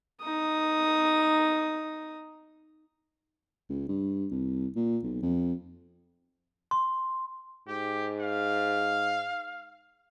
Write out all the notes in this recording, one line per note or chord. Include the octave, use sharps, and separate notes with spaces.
D#4 D#6
C#2
G2
C2
A#2
B1
F2
C6
G#2 G4
F5